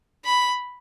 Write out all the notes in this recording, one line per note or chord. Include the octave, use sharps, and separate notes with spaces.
B5